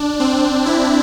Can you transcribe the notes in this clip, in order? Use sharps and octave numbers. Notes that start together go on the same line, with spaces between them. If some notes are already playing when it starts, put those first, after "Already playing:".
Already playing: D4
C4
E4